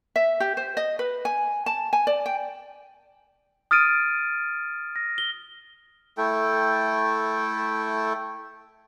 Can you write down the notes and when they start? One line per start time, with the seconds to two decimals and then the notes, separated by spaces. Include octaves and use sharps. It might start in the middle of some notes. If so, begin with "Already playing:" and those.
0.16 E5
0.40 G4
0.57 C5
0.77 D#5
0.99 B4
1.25 G#5
1.66 A5
1.93 G#5
2.07 D5
2.26 G5
3.71 D#6 F6 A6 D7 D#7
4.96 A#6
5.18 G7
6.18 A3 E4 A4 G5